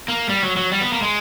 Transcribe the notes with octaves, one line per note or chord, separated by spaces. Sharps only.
A#3
G3
F#3
F#3
G3
B3
A#3
G#3